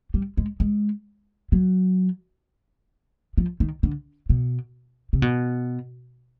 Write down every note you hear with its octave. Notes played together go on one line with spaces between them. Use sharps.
G3
G#3
G#3
F#3
F3
D#3
D3
B2
C3
B2